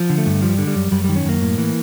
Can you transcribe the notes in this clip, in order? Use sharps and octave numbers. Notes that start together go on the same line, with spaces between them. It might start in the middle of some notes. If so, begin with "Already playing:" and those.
Already playing: F3
D3
A3
G2
F3 G3
D3
G3
F#2
F#2 G3
D#3 G3
C#4
F#2 A#3
A2
E3